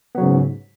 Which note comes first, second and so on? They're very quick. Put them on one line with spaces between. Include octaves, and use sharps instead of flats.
B3 F#3 C#3 G#2